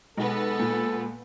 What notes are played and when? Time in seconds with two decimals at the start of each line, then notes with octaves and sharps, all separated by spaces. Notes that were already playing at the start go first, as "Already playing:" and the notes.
0.18 B1 G#3 B3 A4 B4
0.59 A#2